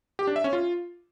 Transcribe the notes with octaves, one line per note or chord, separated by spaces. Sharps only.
G4
D4
E5
C#4
F4